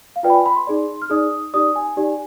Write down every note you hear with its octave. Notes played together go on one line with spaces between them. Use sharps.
F5
F4 B4 D5 G5
B5
G#5
B5
C6
D#4 G#4 D5
F6
D#4 G#4 D5 D#6
D#4 G4 D5 D#6
G#5
D#4 G4 D5